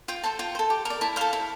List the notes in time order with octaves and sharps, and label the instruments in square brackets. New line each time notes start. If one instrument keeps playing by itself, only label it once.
[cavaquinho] F4 G5
A4 C5 A5
F4 G5
A4 C5
G4
A#4 D5
E4 A5
A4 C5 F5
E4